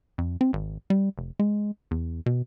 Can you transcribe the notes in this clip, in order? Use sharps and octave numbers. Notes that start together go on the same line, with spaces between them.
F2
C4
G#1
G3
F1
G#3
E2
B2